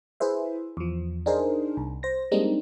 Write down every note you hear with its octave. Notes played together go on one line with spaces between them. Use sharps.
E4 G#4 B4 C5 E5
E2 F3
D4 D#4 G#4 A#4 C5
C2
C5 A#6
G3 G#3 A#3 C4 D4 D#4